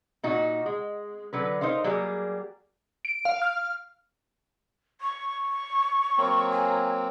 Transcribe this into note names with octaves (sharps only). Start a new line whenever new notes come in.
A#2 D#4 F#4
G#3
D3 F#3 B4
D#4 A#4 C5 F5
F#3 G3 A#3 G4 G#4
D7
F5
F6
C#6
F#3 A#3 C4
G#5